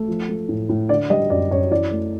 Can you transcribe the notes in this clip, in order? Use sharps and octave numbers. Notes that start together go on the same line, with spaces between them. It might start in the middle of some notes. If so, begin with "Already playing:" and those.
Already playing: A3
F3
A3
A2
A2
D3 D5
G3 D#5
F#2 D5
F#2 C#5
E3 D5
A3